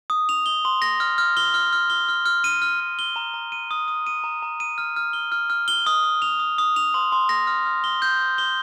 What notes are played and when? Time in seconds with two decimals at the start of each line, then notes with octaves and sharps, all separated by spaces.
0.10 D#6
0.29 F7
0.46 G7
0.65 C6
0.82 A#6
1.00 F6
1.18 F6
1.37 G7
1.54 F6
1.73 F6
1.90 G7
2.09 F6
2.26 F6
2.44 D#7
2.62 F6
2.80 F6
2.99 G7
3.16 A#5
3.34 A#5
3.52 D#7
3.71 D#6
3.88 D#6
4.07 D#7
4.24 A#5
4.42 A#5
4.60 D#7
4.78 F6
4.96 F6
5.13 G7
5.32 F6
5.50 F6
5.68 G7
5.86 D#6
6.04 D#6
6.22 F7
6.39 D#6
6.58 D#6
6.76 F7
6.94 C6
7.12 C6
7.29 A#6
7.47 F6
7.66 F6
7.84 G7
8.02 G6
8.19 G6
8.38 G7